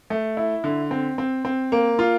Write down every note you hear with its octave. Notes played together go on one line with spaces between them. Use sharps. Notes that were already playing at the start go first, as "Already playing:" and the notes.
A3
E4
D3
C4
C4
C4
A#3
F4